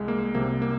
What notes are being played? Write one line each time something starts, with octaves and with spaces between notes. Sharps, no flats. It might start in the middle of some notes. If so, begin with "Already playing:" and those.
Already playing: C2 G#3
A#3
C2 C3 G3 A#3
A#3